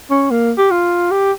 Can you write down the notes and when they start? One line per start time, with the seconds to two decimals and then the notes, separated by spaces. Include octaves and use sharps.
0.10 C#4
0.31 A#3
0.58 G4
0.71 F4
1.11 G4